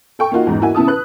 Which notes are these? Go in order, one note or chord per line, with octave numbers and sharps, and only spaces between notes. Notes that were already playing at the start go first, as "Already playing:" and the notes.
A4 G5 C#6
A#3 D#4 F4 F#4
E2 G#2
A#3 E4 F#4 G#5
C#3 B3 E4 A5 D#6
B4 F#6